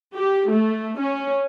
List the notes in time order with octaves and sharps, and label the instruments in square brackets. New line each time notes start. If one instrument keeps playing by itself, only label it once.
[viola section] G4
A3
C#4